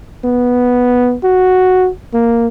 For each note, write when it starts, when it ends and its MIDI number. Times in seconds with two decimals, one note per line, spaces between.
0.24 1.16 59
1.23 1.89 66
2.13 2.47 58